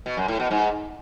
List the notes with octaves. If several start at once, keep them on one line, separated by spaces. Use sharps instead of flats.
B2
F#2
A2
B2
G#2